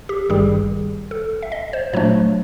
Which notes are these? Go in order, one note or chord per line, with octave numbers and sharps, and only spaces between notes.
G4
G#1 G2 D#3 G3 G#4
A4
E5
D#5
C5
A#2 F#3 A3 D4 C#5